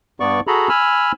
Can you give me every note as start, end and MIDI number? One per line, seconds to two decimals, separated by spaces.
0.20 0.40 43
0.20 0.40 59
0.20 0.40 74
0.20 0.40 85
0.47 0.69 66
0.47 0.69 68
0.47 0.69 69
0.47 0.69 82
0.47 0.69 83
0.69 1.12 80
0.69 1.12 83
0.69 1.12 88
0.69 1.12 89